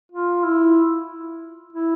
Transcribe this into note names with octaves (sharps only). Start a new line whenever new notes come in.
F4
E4
E4